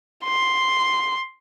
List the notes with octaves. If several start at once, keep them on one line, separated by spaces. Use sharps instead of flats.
C6